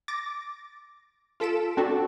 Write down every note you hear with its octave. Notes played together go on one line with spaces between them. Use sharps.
D6 A6 A#6
F4 A4 B6 D7 E7
C4 D4 F#4 A4